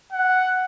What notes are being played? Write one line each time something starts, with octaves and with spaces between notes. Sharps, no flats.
F#5